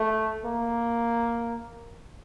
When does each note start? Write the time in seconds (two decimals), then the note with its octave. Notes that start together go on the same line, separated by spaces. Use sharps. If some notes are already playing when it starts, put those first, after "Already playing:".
Already playing: A3
0.45 A#3